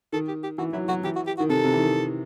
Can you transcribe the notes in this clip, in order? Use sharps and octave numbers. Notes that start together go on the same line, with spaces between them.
D#3 A4
G4
G4
E3 F#4
F#3 E4
F#3 F#4
E3 G4
F#4
G4
D#3 F#4
C3 A4
C3
E3
D#3